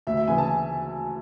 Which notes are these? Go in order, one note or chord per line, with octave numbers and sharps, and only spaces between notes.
D2 E5
E5
C#3 E3 G#5
A5
G#5